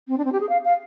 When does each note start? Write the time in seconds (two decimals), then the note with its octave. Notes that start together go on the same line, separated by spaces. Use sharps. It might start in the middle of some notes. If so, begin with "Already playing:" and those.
0.08 C4
0.18 D4
0.25 C4
0.32 G4
0.40 G#4
0.49 F5
0.65 F5